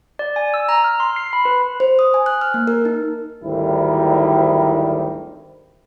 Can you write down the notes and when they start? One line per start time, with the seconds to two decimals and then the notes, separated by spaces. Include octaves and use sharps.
0.19 D5
0.36 G#5
0.54 E6
0.69 A#5
0.84 F6
1.00 C6
1.16 C7
1.33 B5
1.45 B4
1.80 C5
1.99 D#6
2.14 G#5
2.26 F#6
2.41 F6
2.54 A#3
2.68 A#4
2.85 D#4
3.43 G#1 D2 D#3 F#3 G3 E4